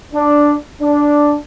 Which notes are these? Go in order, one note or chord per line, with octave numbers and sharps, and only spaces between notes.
D4
D4